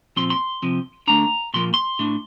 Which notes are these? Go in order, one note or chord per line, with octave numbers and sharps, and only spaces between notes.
A#2 F3 C4 C6
C6
C3 F3 C4
D3 A3 D4 A#5
A#2 F3 A#3 C6
C6
A2 A3 D4